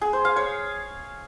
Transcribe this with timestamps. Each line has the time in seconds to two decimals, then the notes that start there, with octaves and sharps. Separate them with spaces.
0.01 G#4
0.13 C5
0.25 F5
0.36 C#5